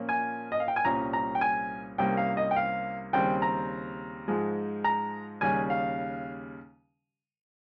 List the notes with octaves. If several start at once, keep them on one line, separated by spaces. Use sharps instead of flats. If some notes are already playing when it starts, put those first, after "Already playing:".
Already playing: A#2 F3 A#3 C#4
G#5
D#5
F5
G5
G#5
C2 A#2 G3 C#4 A#5
A#5
G5
G#5
C2 C3 G3 A#3 C#4 G5
F5
D#5
G5
F5
D#2 C#3 G3 C4 G5
A#5
G#2 F3 G#3
A#5
D#2 C#3 G3 C#4 G#5
F5